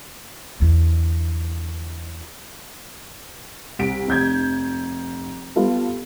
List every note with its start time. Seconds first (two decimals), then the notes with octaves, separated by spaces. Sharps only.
0.60 E2 D3
3.79 C2 B6 D7
4.08 F1 G6 G#6
5.56 G3 B3 F4 A4